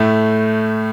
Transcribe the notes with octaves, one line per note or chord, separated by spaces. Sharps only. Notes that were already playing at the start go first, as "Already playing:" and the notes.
Already playing: A2 A3